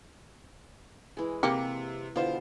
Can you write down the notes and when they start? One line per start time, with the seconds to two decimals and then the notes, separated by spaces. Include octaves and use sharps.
1.17 E3 G#3
1.43 C3 A#3 G4 C#7
2.16 B2 D3 E3 F4 C5